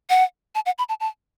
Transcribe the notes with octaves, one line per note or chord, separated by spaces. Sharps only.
F#5
A5
F#5
B5
A5
A5